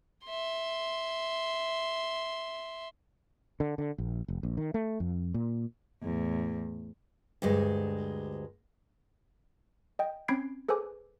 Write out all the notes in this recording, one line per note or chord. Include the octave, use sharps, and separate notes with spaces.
E5 C6
D3
D3
A#1
F1
A#1
D#3
A3
F2
A#2
E2 A2
D2 G2 G#3
D#5 G5
C4 C#4 B5 G#6 C7 D7
G#4 A4 B4 C5 G#5 D6